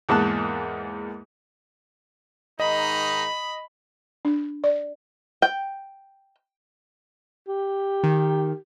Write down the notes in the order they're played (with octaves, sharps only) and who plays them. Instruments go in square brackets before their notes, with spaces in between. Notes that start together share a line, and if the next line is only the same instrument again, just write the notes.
[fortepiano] E2 G#2 A#3 A5 F#6
[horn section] G#2 D#3 D#4 [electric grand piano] D#5 [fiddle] B5
[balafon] D4
D5
[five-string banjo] G5
[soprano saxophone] G4
[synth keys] D#3